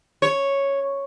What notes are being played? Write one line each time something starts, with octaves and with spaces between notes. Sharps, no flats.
C#5